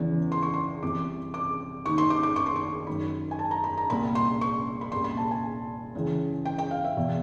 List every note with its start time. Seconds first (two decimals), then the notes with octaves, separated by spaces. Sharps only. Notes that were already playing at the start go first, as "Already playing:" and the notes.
Already playing: E2 C#3 E3
0.32 C6
0.43 C#6
0.54 C6
0.83 C2 C3 E3 D6
1.34 D6
1.85 D#2 D#3 C#6
1.98 C6
2.10 D6
2.23 D6
2.36 C#6
2.46 C6
2.56 C#6
2.87 F#2 D#3 B5
3.31 G#5
3.39 A5
3.51 A#5
3.64 B5
3.77 A#5
3.90 C2 A#2 B5
4.15 C6
4.41 C#6
4.81 B5
4.92 C2 A#2 C6
5.04 B5
5.17 A5
5.31 G#5
5.95 C#2 C#3 E3
6.45 G5
6.58 G5
6.71 F5
6.85 E5
6.96 E2 B2